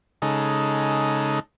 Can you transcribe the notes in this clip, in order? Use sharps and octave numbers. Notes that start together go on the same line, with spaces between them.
C#3 G#3 D#4 A4